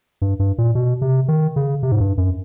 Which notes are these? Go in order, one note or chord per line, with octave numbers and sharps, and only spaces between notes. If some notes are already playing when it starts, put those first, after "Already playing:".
G2
G2
A#2
B2
C3
D#3
C#3
C3
G#2
G2
F#2